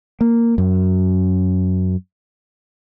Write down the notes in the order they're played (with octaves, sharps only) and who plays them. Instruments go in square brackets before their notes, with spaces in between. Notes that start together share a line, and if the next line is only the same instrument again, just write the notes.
[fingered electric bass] A#3
F#2